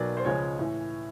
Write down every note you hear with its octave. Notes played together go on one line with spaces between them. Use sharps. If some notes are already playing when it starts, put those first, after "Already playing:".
Already playing: B1 B2 F#3 A#3 D5
C5
C#2 C#3 F3 G#3 C#5
A2 E3